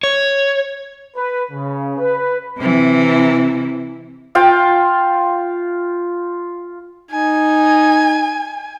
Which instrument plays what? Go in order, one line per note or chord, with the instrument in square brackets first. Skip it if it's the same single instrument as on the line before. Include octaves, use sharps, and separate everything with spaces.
[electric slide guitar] C#5
[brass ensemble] B4
C#3
B4
[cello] C3 E3
[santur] F4 F5 G5
[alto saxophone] D#4 [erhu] G#5